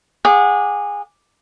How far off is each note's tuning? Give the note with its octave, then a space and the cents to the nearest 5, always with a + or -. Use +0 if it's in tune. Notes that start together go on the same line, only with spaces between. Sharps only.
G#4 -20 F#5 -35 D6 +0